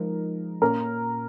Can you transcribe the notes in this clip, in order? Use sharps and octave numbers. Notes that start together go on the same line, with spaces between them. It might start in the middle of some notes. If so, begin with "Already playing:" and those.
Already playing: F3 G#3 D#4 A#4
A#2 A#3 C#4 A#4